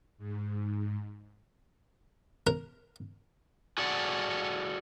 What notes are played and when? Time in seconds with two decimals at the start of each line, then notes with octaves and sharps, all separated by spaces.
0.18 G#2
2.47 A#4
3.78 F#4 G#4 A4 D5 F#5